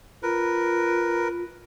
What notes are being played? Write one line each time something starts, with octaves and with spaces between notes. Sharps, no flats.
F4 A#4 B4